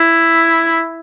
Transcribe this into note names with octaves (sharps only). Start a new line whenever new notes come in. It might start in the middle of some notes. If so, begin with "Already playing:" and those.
Already playing: E4